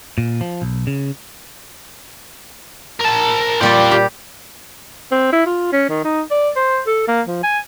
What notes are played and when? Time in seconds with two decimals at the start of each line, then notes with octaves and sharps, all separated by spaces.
0.18 A#2
0.41 F3
0.62 B1
0.87 C#3
3.00 A#4 A5
3.61 A#2 G3 F4 D5 G5
3.91 G4
5.12 C4
5.33 E4
5.46 F4
5.73 C#4
5.90 D#3
6.05 D#4
6.31 D5
6.56 C5
6.87 A4
7.08 A#3
7.28 F3
7.44 G#5